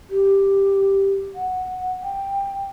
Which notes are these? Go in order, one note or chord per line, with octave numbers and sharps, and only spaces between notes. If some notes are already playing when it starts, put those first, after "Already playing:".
G4
F#5
G5